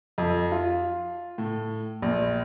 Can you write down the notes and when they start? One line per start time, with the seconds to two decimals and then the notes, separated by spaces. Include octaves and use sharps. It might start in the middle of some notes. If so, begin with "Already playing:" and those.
0.18 F2
0.52 F4
1.38 A2
2.02 A#1